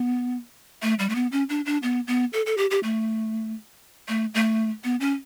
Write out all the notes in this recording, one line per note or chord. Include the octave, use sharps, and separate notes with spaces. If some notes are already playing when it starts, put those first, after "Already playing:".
Already playing: B3
A3
G3
A3
B3
C#4
D4
D4
B3
B3
A4
A4
G4
G4
A3
A3
A3
B3
C#4